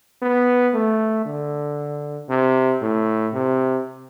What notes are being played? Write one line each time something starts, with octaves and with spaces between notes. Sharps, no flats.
B3
A3
D3
C3
A2
C3